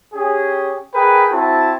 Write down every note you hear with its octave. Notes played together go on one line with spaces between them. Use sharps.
C#4 G4 G#4
G#4 A#4 B4 G5
C4 E4 F#4 A5